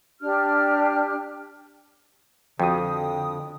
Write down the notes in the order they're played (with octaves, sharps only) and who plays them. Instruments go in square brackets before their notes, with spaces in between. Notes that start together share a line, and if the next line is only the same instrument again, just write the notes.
[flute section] D4 G4 F6
[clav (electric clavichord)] F2 [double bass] D3 [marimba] F3 F#4 [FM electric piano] G5 D#6